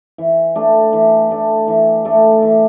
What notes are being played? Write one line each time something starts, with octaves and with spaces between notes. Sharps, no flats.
E3
A3 D4
E3
A3 D4
E3
A3 D4
E3